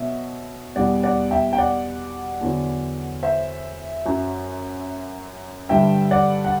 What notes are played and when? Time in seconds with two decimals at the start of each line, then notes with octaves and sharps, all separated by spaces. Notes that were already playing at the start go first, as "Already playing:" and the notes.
Already playing: B2 F#3 E5
0.76 E2 B2 G3 D5 F#5
1.03 D5 F#5
1.31 E5 G5
1.53 G5
1.58 D5 F#5
2.41 E2 D3 F#3
3.23 C5 E5
4.05 F#2 F#3
5.69 G2 D3 G3 E5 G5
6.11 D5 F#5
6.45 F#5